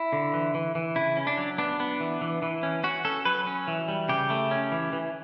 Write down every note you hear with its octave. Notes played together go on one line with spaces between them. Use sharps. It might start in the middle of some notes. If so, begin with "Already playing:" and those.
Already playing: E4
D3
E3
E3
E3
C#3 E4
C#4
D4
F#3
B3 D4
B3
E3
E3
E3
C#4
C#4 F#4
C#4 A4
F#3 B4
C#4
E3
G3
C#3 G4
A3
C#4
E3
E3